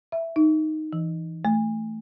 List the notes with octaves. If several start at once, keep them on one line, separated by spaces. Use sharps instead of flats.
E5
D#4
E3
A3